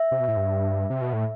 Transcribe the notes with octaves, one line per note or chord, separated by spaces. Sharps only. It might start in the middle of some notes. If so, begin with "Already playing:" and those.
Already playing: E5
C3
B2
A2
G2
C3
B2
A2